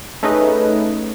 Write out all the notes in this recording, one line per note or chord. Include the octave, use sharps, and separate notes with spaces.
A3 C#4 D#4 G#4 B4 D#5